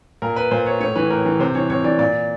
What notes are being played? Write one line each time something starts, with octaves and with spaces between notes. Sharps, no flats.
A#2 A#4
B4
A#2 C5
C#5
A2 C#5
E3 B4
A2 A#4
E3
C3 C5
E3 C#5
C3 C#5
E3 D5
A#2 D5